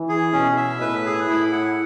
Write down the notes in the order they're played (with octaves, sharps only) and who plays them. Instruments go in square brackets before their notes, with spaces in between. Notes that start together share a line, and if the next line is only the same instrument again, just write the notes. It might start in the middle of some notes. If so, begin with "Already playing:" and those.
Already playing: [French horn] E3
[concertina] G#4
[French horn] B2 [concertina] C#4
[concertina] E5
[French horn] A2 [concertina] B4
[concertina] G#4
[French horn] A2 [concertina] E4
[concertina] F#5